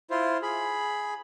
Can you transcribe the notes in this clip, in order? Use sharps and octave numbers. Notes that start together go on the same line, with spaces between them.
E4 F4 C5
G#4 B5